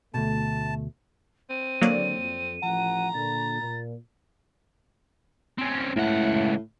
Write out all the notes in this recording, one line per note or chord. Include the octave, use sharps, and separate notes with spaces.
D2 G2 B2 A3 A5
C4 D#7
G#1 D3 F#3 A#3 D5
F2
A1 F3 F#5 A#5
A#2 D3 A6
A#2
C4 C#4
C#2 A2 F#5